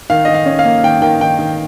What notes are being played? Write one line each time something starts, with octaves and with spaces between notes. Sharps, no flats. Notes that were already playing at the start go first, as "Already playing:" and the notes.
D#3 F5
D#3 D#5
F5
C#4
F5
A#3
D#3 G5
D#3 G5
D#3 G5
D#3